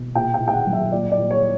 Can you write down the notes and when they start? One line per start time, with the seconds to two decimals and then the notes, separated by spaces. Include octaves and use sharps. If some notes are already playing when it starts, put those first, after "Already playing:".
Already playing: B2
0.15 A#2 G5
0.34 G5
0.41 A#2
0.48 G5
0.53 F#5
0.67 F#3
0.73 E5
0.92 A#2 D5
1.12 D5
1.18 A#2
1.31 C#5